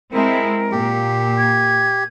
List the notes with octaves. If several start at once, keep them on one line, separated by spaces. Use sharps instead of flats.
G#3 C4 E4 A#4
A#2 G4
G#6